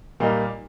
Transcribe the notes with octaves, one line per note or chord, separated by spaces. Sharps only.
A#2 G3 A#3 D#4